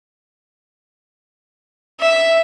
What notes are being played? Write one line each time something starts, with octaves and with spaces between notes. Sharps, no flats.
E5